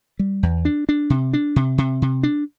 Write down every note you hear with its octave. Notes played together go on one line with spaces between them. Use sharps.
G3
E2
D4
D4
C3
D4
C3
C3
C3
D4